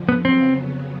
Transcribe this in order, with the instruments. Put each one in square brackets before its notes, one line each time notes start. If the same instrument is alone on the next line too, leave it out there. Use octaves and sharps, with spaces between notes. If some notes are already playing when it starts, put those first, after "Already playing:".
Already playing: [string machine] F2 D3 F3
[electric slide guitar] B3
[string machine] F2 C#3 F#3 B3 [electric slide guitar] C4